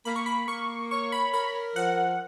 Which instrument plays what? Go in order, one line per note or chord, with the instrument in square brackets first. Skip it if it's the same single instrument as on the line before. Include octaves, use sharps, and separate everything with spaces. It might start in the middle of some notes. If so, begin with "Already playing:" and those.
[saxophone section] A#3 [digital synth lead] B5
[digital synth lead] C#6
B5
[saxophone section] A#3 [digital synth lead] C#6
[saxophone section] C#5 [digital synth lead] C#6
[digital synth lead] B5
[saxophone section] A#4 [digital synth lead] B5
[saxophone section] F3 [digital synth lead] F#5